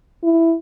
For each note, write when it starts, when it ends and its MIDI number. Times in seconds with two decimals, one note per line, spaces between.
0.23 0.54 64